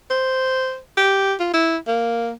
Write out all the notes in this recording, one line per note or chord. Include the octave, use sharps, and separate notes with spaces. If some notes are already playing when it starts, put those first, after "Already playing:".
C5
G4
F4
E4
A#3